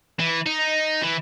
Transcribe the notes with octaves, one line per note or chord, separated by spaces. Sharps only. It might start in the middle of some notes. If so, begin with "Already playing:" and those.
E3
D#4
E3